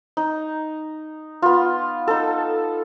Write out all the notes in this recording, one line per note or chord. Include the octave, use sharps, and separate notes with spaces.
D#4
B3 F4
D#4 A4